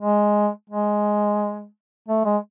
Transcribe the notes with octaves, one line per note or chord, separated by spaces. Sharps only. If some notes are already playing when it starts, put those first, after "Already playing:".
G#3
G#3
A3
G#3